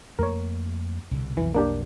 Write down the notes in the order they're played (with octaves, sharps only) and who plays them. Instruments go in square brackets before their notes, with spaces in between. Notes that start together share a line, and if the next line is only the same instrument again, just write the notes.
[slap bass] F2 A3 A#3 [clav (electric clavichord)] A#4 C#5
[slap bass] C2 B2 D3
[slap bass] B1 F2 [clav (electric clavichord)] E3
[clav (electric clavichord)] A#3 D4 G4